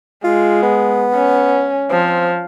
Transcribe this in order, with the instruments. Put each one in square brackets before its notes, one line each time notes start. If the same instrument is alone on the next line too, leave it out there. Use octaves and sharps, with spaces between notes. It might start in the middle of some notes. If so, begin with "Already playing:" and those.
[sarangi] G#3 [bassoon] F4
[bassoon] B3
[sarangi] C#4
[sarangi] F3 [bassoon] C4